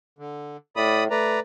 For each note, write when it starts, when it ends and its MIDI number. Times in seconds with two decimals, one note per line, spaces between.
0.19 0.57 50
0.76 1.10 45
0.76 1.04 74
0.76 1.04 83
0.76 1.04 87
1.10 1.38 57
1.10 1.40 71
1.10 1.40 74
1.10 1.40 82